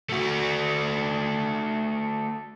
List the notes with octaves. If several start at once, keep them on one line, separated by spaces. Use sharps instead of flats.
A3 F#4